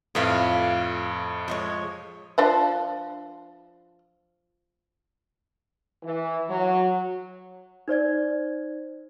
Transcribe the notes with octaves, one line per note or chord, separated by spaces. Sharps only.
F2 A2 F4 B4 F5
F3 G#3 C#5
F3 D4 F#5
E3
F#3
D#4 C5 D5 G#6